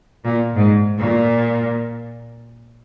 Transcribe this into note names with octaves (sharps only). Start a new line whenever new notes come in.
A#2
G#2
A#2